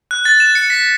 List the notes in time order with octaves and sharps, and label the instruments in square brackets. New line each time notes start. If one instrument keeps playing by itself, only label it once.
[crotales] F#6
A6
E7
C#7
B6